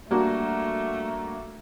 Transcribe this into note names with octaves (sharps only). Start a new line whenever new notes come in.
G3 A3 A#3 D4 F#4